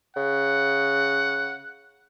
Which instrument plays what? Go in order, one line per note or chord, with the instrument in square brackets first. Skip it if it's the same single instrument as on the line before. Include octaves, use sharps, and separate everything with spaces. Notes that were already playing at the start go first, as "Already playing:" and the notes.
[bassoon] C#3 [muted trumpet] F#5